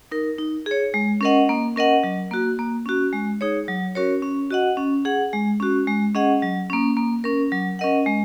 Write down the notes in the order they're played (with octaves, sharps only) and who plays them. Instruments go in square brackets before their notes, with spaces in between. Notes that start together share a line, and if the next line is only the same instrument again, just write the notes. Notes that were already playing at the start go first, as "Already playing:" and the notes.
[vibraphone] D#4 A#4
D#4
G#4 C#5
G#3
C#4 A#4 D#5 F#5
A#3
C#4 A#4 D#5 F#5
F#3
A#3 F#4
A#3
C#4 F#4
G#3
D#4 G#4 C#5
F#3
C#4 F#4 A#4 C#5
C#4
F#4 D#5 F#5
C#4
G#4 F#5
G#3
C#4 F#4
G#3
C#4 G#4 D#5 F#5
F#3
A#3 C#4
A#3
C#4 A#4
F#3
C#4 A#4 D#5 F#5
G#3